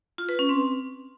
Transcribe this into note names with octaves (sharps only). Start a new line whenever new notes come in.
F4
B4
C#4
C4